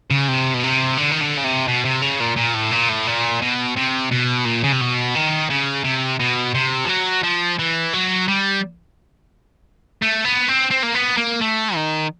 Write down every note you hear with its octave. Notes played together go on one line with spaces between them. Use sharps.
C#3
C3
B2
C3
D3
D#3
D3
C#3
C3
B2
C3
C#3
A#2
A#2
A2
A#2
A2
A#2
B2
C3
B2
A#2
C#3
C3
B2
D#3
C#3
C3
B2
C3
F3
F#3
F3
E3
F#3
G3
A3
B3
C4
C4
A#3
B3
A#3
A3
D#3